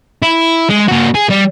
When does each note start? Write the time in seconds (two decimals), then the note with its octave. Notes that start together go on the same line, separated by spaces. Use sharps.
0.22 E4
0.70 G#3
0.88 A#3 F#4
1.15 G#4
1.30 G3